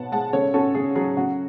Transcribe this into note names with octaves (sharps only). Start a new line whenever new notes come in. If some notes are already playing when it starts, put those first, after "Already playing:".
Already playing: B2 B3 C#5 F#5 A5
G#3 F#5 A5
C#3 A4 C#5
C#4 F#4 A4
C#3 G#4
F#3 G#4
C#3 F#4